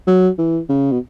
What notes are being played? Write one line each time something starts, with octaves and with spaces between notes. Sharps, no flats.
F#3
E3
C#3
B2